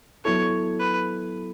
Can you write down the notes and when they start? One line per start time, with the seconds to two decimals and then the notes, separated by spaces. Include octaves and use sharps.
0.25 F#3 B3 E4 A4 C#5
0.79 B4